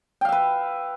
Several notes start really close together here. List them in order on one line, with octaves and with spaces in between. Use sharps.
G5 F5 E5 B4